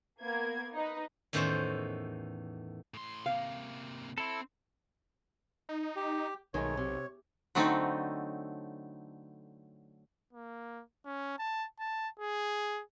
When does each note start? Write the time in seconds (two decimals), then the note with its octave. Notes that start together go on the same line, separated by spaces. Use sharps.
0.21 A#3 B3 G#6
0.73 D#4 B4
1.33 E2 A2 D#3 E3 C#4 C5
2.94 A2 C6
3.26 C3 A#3 F5
4.18 C4 E4 A4
5.69 D#4
5.96 G4
6.54 B1 D#3 G#3 A3 C#5
6.77 C3
7.55 D3 F#3 A3 C4 D#4 A4
10.33 A#3
11.06 C#4
11.39 A5
11.79 A5
12.20 G#4